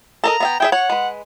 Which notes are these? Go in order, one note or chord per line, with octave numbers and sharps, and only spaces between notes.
A4 A#4 D#5 A#5
B3 E5 G5
E4 G#4 E5 G5
C#5 F#5
G#3 B4